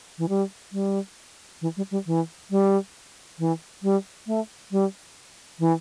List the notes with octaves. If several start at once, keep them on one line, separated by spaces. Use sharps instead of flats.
E3
G3
G3
E3
G3
G3
E3
G3
E3
G3
A3
G3
E3